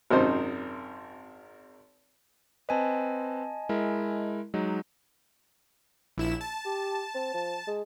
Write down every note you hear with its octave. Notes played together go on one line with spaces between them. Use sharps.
G#1 F#2 C3 D#4 C5
C4 B4 D#5 G#5 A5
G#3 E4 A#4
F#3 G#3 D#4
A#1 E4 E7
A5
G4
C4
F3
G#3